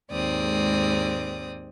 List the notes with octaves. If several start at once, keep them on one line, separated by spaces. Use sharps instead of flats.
D#2 G#2 G#3 C4 D5 D#6